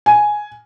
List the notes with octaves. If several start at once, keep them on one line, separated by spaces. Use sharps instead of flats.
G#5